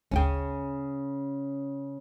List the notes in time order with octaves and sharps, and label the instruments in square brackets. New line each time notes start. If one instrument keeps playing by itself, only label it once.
[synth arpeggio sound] G1 D2 G5 [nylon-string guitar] C#3 C#4